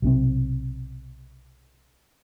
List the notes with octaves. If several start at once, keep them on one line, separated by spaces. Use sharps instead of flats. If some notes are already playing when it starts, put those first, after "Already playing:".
B1 C3 C4